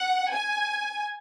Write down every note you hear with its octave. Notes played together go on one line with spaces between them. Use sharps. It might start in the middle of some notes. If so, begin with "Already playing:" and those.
Already playing: F#5
G#5